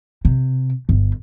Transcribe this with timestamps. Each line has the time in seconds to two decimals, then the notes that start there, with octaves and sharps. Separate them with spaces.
0.25 C3
0.89 G1